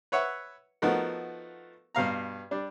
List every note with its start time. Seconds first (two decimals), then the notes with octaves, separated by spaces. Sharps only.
0.12 B4 C#5 E5 F#5
0.82 F3 A3 B3 D#4 F#4 A#4
1.95 G2 B2 F5 A#5
2.51 G3 D4